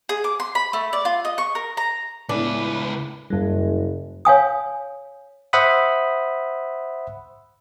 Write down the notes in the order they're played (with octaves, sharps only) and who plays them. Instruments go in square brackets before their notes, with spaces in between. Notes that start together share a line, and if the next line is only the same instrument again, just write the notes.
[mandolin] G#4
D6
C6
B5
A3
D5
F4
D#5
C#6
A#4
A#5
[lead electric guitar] C#2 B4 [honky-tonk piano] A2 B3 G#5 [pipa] D4
[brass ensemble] F#1 [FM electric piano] F#2 G3
[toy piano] C#5 F5 G#5 D#6
[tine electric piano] C5 E5 F#5 B5 D#6